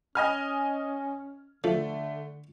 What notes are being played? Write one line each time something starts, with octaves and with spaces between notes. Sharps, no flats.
C#4 D#5 G#5 F6
D3 F3 A3